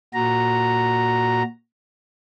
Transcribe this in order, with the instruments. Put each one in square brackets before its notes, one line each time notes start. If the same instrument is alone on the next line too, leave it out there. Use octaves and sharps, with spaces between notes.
[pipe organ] A#2 F#4 A#5